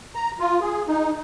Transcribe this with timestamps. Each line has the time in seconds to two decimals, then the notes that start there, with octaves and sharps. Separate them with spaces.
0.15 A#5
0.40 F4
0.61 G#4
0.89 D#4